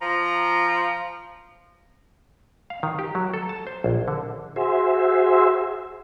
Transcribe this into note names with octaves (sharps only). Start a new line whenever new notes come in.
F3 A#5
F5
D#3
G4
F#3
A4
A5
C5
A#1
D3
F#4 G#4 C5 E5